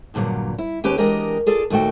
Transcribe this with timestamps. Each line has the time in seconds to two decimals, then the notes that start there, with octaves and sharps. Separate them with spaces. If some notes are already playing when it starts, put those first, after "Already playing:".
0.14 E2 G2 A#2 D3 F#3
0.58 E4
0.84 D#2 C#4 G4 B4
0.98 E3 G#3 D4 G4 A#4 D#5
1.46 F4 G#4 A4 D5
1.70 D#2 A#2 A3 F#4 G5